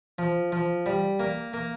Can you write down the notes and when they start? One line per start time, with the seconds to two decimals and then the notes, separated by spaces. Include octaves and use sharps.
0.19 F3
0.52 F3
0.86 G3
1.20 A#3
1.53 A#3